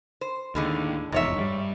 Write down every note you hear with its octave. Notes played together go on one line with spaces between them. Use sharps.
C5
D#2 A2 D3 G#3
F1 E2 G#2 C#5 E5
G2 D#3 G3